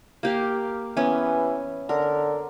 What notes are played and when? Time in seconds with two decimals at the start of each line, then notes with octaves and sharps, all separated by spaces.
0.23 A#3 G4 F5
0.97 E3 B3 C#4
1.89 D3 A#4